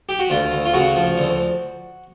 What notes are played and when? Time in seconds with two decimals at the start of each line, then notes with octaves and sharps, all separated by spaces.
0.09 G4
0.19 F#4
0.30 D2 F4
0.52 D2
0.65 F4
0.74 C#3 F#4
0.96 F3
1.18 D2